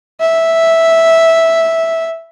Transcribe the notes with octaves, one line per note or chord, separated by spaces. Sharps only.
E5